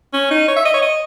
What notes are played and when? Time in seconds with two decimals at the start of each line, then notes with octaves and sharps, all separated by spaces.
0.13 C#4
0.30 D#4
0.48 C#5
0.56 E5
0.65 D#5
0.74 C#5
0.82 D#5